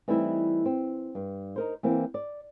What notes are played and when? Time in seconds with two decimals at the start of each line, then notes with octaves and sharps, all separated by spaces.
0.08 E3 G3 A3 C4 D#4 E4
0.65 C4
1.15 G2
1.56 D#4 A#4 C5
1.83 E3 A#3 C4
2.14 D5